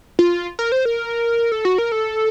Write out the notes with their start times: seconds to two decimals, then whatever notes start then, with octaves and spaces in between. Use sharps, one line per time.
0.19 F4
0.59 A#4
0.72 C5
0.85 A#4
1.52 A4
1.65 F#4
1.78 A#4
1.92 A4